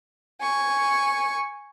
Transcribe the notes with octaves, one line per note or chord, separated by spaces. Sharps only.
G#5 C#6